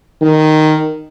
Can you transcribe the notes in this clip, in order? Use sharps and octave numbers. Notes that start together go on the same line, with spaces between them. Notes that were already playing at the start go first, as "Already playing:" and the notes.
D#3